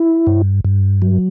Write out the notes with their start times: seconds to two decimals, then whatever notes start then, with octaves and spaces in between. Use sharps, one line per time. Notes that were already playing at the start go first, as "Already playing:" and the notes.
Already playing: E4
0.27 G2
0.65 G2
1.02 F#3